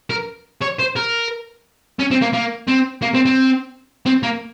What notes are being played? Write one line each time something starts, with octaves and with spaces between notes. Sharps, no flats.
A#4
C#5
C5
A#4
C#4
C4
A#3
A#3
C4
A#3
C4
C4
C4
A#3